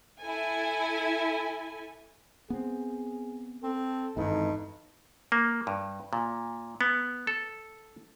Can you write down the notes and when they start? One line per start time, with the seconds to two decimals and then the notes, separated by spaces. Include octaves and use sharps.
0.20 E4 A4 G#5
2.50 B3 C4 G#4
3.64 C4 A4
4.17 G#1 E2 G2 E3 D#4
5.32 A#3
5.67 G2
6.13 A#2
6.81 B3
7.27 A4